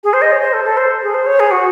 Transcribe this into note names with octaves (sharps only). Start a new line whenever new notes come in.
G#4
C5
D#5
C#5
C5
A4
A4
C5
G#4
C5
C#5
G#4
F#4